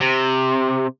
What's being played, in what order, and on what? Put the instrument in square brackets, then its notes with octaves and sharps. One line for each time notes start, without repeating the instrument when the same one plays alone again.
[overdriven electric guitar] C3